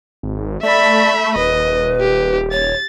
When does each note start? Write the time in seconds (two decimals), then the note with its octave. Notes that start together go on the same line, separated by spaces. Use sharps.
0.23 G#1
0.63 A3 D5 E5 B5
1.36 D#1 B4 D#5
2.01 G4
2.52 C#5 A6